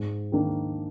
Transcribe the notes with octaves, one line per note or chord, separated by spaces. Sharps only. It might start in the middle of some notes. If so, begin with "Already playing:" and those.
Already playing: G#2
D#3 A#3 D4